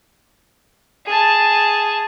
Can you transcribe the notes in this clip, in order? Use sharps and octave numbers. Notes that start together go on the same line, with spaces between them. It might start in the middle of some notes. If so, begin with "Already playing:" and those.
G#4 A5